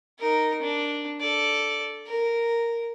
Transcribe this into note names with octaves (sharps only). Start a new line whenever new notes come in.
D#4 A#4
D4
A4 D5
A#4